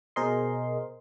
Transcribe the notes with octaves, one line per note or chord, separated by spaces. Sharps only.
B2 G#4 A#4 C5 D#5 C6